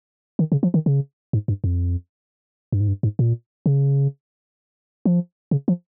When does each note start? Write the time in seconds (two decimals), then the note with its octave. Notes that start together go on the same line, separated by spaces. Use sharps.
0.39 D#3
0.52 C#3
0.63 F3
0.74 D#3
0.86 C#3
1.33 G#2
1.48 G2
1.64 F2
2.72 G2
2.80 G#2
2.88 G2
3.03 G#2
3.19 A#2
3.66 C#3
5.06 F3
5.51 C#3
5.68 F3